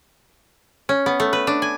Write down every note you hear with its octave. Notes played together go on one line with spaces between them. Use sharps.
C#4
B3
A3
B4
D4
G#5